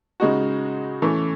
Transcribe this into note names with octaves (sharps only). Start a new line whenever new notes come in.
C#3 G#3 D#4 F#4
E3 A3 C#4